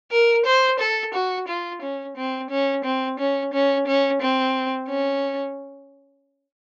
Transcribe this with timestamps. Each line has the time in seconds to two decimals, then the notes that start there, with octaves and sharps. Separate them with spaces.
0.11 A#4
0.45 C5
0.80 A4
1.14 F#4
1.48 F4
1.81 C#4
2.17 C4
2.50 C#4
2.84 C4
3.19 C#4
3.53 C#4
3.87 C#4
4.21 C4
4.89 C#4